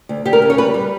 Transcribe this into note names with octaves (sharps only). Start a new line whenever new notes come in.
D2
D2 G4
A#4
C#3
C#5
G3 B4
G3